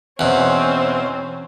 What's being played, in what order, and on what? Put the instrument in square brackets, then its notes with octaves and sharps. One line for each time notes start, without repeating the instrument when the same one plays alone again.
[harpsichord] E2 B2 [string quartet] C4 C#4 C5